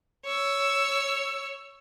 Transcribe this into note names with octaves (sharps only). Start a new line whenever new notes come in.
C#5 E6